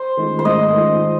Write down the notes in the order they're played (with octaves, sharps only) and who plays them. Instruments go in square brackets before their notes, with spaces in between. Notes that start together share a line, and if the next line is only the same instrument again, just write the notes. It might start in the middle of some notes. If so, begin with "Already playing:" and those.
Already playing: [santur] C5
[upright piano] D#3 G#3 F4
[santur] C5
[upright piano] G#2 [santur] D#5
[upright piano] D#3 G#3 F4